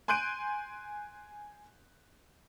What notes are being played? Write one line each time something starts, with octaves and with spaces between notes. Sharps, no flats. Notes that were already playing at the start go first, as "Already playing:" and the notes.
G#5 C6 F#6 G6 D7 D#7